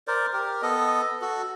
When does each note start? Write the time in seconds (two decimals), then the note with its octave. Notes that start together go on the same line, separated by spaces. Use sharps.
0.08 A#4 C5 D5
0.33 G4 A#4
0.62 B3 A4 D#5
1.21 F#4 A4